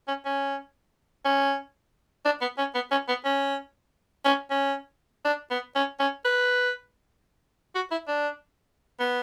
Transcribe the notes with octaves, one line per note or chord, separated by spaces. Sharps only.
C#4
C#4
C#4
D4
B3
C#4
B3
C#4
B3
C#4
C#4
C#4
D4
B3
C#4
C#4
B4
F#4
E4
D4
B3